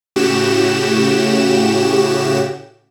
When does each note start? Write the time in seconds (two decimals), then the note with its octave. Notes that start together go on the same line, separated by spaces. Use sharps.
0.16 A2 C#3 F#4 G4 E7